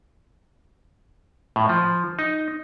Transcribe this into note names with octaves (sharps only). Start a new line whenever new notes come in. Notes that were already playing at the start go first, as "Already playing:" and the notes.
A2
F3
D#4